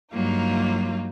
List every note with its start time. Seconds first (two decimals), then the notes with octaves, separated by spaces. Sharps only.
0.12 G2 F#3 A#3 D#4 F4